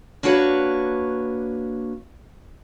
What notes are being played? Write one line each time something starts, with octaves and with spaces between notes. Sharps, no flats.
A#3 D4 F#4 B4 C#5